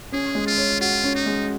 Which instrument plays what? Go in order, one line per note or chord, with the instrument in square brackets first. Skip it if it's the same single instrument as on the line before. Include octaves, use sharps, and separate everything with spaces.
[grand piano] C#4 [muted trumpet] G#4
[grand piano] G#3
[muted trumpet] F4
[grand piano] C#5
[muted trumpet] F4 [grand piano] F#4
[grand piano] C#4
[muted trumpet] D#4
[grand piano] G#3